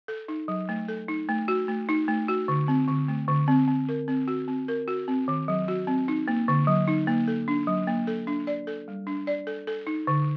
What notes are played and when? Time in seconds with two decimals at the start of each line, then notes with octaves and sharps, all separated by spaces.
0.08 A4
0.28 D#4
0.48 F#3
0.69 A3
0.88 A4
1.08 D#4
1.29 A3
1.48 F#4
1.68 A3
1.89 D#4
2.08 A3
2.28 F#4
2.48 D3
2.68 C4
2.88 D3
3.08 A3
3.28 D3
3.48 C4
3.68 C4
3.89 A#4
4.08 C4
4.28 F#4
4.48 C4
4.68 A#4
4.88 F#4
5.08 C4
5.28 D#3
5.48 F#3
5.68 F#4
5.87 C4
6.08 D#4
6.28 A#3
6.48 D3
6.67 F#3
6.88 D#4
7.07 A#3
7.28 A4
7.48 D4
7.67 F#3
7.87 A#3
8.07 A4
8.27 D4
8.47 D5
8.67 A4
8.88 G3
9.07 D4
9.27 D5
9.47 A4
9.67 A4
9.87 D#4
10.07 D3